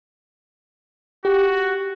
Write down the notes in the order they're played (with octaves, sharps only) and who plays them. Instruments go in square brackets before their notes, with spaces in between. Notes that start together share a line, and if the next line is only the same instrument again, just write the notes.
[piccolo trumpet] F#4 [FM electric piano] G4